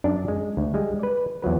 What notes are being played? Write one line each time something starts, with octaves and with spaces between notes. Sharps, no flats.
F#2 D4 D5
G#3
D2
G3 G#3
B4 D5
E2 F3 F#3 B4